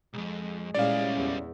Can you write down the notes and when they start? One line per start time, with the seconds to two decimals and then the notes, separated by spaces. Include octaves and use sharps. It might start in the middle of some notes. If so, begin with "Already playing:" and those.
0.13 B1 F2 G#3
0.74 A1 A#2 G3 G#3 C#4 E4 D5 F5
1.17 E2